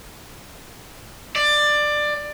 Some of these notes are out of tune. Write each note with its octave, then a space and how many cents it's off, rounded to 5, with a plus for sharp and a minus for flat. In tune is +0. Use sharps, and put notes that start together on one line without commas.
D5 +15